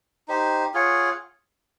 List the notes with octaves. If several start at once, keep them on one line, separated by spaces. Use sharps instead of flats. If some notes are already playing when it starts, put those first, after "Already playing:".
D#4 G4 C5
F4 G#4 C#5 F#5